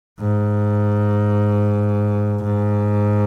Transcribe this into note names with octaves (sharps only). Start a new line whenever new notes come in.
G#2
G#2